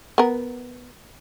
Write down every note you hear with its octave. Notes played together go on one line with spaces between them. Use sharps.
B3 A#4